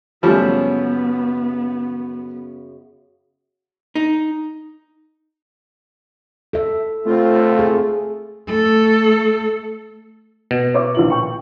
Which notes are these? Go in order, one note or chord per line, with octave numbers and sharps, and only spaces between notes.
F#2 C#3 F3 G3 A3 B3
D#4
A4 E5
A3 C4 F4
G#4
A3 A4
B2
C#5 E5 D6
A#1 A#2 F#7
G5 C#6